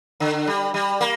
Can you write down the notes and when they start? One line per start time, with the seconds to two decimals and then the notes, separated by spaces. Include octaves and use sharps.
0.20 D3
0.47 G3
0.74 G3
1.01 A#3